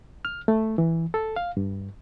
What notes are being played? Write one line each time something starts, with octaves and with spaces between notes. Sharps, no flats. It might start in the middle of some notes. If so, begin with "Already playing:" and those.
F6
A3
E3
A4
F5
G2